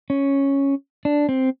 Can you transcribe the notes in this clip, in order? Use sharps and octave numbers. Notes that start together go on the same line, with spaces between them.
C#4
D4
C4